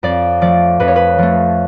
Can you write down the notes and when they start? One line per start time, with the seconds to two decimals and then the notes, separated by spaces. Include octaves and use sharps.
0.03 F2 D5
0.41 F3 A3 D5
0.80 F2 B4
0.88 C#5
0.96 B4
1.19 F3 A3